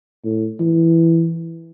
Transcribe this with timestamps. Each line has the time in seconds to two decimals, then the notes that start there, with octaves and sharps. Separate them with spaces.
0.24 A2
0.60 E3